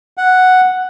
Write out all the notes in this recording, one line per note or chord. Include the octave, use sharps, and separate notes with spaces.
F#5